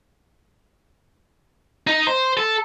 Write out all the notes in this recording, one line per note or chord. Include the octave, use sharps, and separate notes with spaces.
D#4
C5
A4